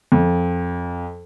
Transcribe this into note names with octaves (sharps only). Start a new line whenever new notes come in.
F2